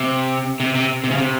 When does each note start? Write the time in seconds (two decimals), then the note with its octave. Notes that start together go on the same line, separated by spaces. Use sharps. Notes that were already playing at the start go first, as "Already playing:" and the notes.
Already playing: C3
0.60 C3
0.75 C3
1.04 C3
1.11 C#3
1.18 C3